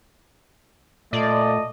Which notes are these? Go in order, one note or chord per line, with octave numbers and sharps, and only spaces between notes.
A#2 A3 D5 D#5